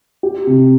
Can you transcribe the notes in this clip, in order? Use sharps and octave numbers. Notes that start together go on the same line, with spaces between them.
G4
C3